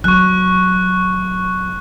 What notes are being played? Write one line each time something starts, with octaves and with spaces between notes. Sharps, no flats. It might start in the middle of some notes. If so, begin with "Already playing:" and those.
F#3 C#6 F#6